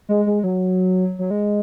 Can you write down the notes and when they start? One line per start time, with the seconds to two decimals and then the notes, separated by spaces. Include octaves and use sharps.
0.09 G#3
0.26 G#3
0.44 F#3
1.19 F#3
1.31 G#3